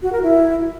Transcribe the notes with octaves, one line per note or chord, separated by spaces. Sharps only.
F#4
A#4
E4